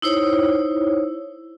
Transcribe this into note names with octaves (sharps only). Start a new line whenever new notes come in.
D#4 E4 C5 C#5